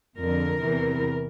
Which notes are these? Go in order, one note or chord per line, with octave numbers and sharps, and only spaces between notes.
F2 D3 A#4
E2 C3 E3